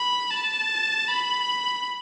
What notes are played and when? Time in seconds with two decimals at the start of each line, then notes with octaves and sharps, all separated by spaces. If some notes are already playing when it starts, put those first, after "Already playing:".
Already playing: B5
0.31 A5
1.08 B5